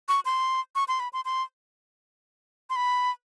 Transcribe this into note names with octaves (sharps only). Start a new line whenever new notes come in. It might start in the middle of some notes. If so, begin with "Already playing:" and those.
C#6
C6
C#6
C6
B5
C6
C6
C6
B5